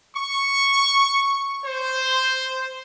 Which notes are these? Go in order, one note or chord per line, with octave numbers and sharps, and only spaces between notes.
C#6
C5